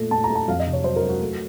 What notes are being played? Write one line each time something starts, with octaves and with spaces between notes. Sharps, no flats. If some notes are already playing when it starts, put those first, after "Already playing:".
Already playing: A#2 A3
A#2 A5
A#5
A3
A5
F2 F5
D#5
C3
C#5
F#3 C5
A#4
F#3
F#4
A3